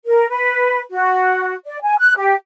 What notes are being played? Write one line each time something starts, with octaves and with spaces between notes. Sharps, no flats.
A#4
B4
F#4
D5
G#5
F#6
G4